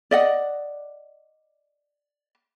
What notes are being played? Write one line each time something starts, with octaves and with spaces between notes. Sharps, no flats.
D5 D#5 F#5